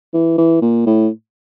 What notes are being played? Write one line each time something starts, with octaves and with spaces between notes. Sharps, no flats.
E3
E3
A#2
A2